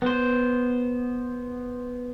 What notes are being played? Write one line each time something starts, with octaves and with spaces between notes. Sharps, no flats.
B3 C5